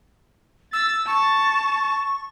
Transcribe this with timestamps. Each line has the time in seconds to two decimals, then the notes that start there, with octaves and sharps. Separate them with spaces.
0.73 E6 A6
1.07 A5 C#6